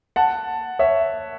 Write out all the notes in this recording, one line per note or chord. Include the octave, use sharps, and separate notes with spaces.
F#5 A5
C#5 E5